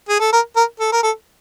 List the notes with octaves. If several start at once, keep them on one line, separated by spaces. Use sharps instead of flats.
G#4
A4
A#4
A#4
A4
A#4
A4